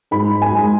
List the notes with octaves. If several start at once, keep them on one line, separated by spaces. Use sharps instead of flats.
G#2 B5
G#5
G#3